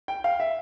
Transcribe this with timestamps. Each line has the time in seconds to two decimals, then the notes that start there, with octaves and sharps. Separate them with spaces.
0.08 G5
0.24 F5
0.40 E5